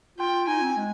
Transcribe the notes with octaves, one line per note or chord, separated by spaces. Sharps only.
F4 G5
D#4 G#5
C4
G#3